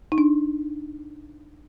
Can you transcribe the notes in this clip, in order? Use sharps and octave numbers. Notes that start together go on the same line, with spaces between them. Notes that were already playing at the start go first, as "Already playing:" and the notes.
D#4
D4